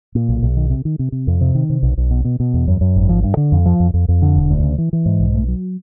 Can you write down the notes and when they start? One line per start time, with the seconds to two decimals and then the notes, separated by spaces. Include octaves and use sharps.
0.15 A#2
0.29 B1
0.43 B1
0.56 D#3
0.70 C3
0.85 D#3
0.99 C3
1.12 C3
1.27 F2
1.41 C3
1.55 D#3
1.70 C3
1.82 B1
1.97 B1
2.11 B2
2.25 B2
2.40 B2
2.54 E2
2.68 F#2
2.81 F#2
2.96 G#1
3.09 F3
3.23 G2
3.37 D3
3.52 F2
3.66 F3
3.80 F2
3.94 F2
4.08 F2
4.22 D3
4.36 E1
4.51 D2
4.63 C#3
4.78 E3
4.93 E3
5.06 G#2
5.20 B1
5.34 A3
5.48 F#3